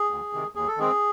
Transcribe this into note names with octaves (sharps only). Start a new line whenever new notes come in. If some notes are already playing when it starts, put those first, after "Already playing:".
Already playing: G#4
D2
C3 D#3
D#2 G#4
A4
D#3 G#3 C4 G#4